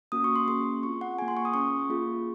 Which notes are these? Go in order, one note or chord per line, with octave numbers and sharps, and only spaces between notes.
A#3 C#4 F#4 D#6
C#6
C6
A#3 C#4 G#4 C6
C4 F4 G#4 C#6
F#5
A#3 F4 G#4 G#5
C6
C#6
D#6
C#4 G#4 C#6
A#3 F4 G#4